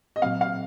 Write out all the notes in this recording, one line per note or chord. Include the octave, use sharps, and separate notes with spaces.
D#5
A#2 F#3 C4 F5
F5